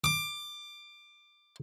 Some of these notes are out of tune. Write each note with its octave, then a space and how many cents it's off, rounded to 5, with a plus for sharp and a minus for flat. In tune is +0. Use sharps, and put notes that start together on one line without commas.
D6 +15